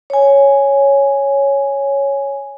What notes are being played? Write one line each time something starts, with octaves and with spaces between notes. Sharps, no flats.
C#5 G#5